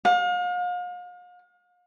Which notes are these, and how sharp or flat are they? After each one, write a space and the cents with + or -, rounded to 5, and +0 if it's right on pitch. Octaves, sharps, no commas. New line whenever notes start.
F5 +40